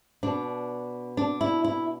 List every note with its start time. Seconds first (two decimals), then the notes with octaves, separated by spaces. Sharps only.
0.23 B2 D4
1.17 D4
1.41 E4
1.65 E4